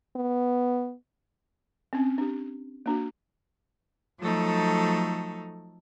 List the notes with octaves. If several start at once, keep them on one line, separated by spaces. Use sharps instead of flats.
B3
C4 C#4
D4 G4
A#3 D4 F#4
F3 F#3 A3 D#4 A4